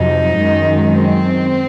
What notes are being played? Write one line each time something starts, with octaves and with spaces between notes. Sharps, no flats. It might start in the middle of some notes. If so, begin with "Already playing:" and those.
Already playing: F2 C3 F#3 D#4
F#2 D#3 G#3
C4